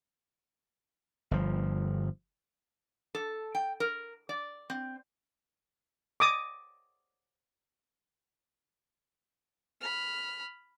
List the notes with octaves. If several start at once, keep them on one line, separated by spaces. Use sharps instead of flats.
G1 F3
A4
G5
A#4
D5
C4
D6 D#6
B5 F6